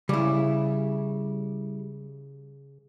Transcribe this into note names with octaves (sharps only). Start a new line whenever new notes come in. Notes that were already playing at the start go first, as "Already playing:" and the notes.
C#3 G3 E4